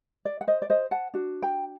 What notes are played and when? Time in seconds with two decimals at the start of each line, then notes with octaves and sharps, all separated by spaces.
0.25 D5
0.41 F#5
0.47 C5 D#5
0.62 D5
0.70 C5 D#5
0.91 F#5 A5
1.14 D4 F#4
1.42 G5 A#5